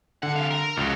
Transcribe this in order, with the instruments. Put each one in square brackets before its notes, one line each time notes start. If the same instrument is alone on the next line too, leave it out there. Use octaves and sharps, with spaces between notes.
[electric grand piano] D3 [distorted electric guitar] F#5
[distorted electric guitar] C3 F5
A#4
[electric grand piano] C#2 [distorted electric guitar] F3 F#4